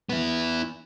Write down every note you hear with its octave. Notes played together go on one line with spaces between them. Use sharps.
B3 E4